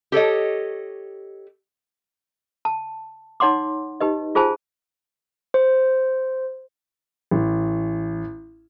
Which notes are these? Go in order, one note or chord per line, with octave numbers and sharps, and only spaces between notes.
G4 A4 C#5 D#5
A5
D#4 C#5 F#5 C6 D6
D#4 G4 B4 D#5
F4 G#4 C5 G#5 A5
C5
A1